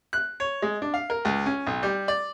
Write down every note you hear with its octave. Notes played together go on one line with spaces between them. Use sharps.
F#6
C#5
G#3
D4
F5
A#4
C#2
C#4
B1
G3
D5